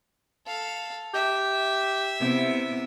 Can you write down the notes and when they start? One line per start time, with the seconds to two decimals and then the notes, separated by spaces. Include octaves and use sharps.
0.46 A4 F5
1.14 G4 E5
2.19 C3 B3 E4